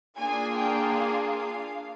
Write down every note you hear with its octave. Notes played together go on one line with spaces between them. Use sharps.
A#3 D4 F4 G#4 G#5
G5
F5
F5